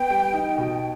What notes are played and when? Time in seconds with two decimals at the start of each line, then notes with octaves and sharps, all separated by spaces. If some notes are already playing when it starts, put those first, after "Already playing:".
Already playing: B3 G5
0.10 G3
0.33 D#4
0.58 B2